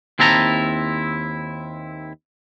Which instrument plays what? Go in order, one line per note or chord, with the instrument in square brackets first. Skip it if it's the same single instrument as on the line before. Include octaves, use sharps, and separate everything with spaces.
[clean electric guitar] D#2 C4 E4 A5 A#5